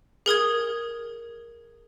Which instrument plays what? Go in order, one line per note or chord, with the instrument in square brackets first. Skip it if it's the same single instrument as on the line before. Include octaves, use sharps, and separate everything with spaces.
[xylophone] G#4 A#4 D#6 G#6